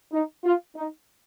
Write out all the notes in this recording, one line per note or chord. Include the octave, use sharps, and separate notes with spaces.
D#4
F4
D#4